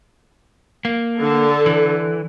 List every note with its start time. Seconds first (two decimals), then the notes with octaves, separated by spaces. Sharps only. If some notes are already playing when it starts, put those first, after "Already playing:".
0.85 A#3
1.19 D3 A4
1.66 E3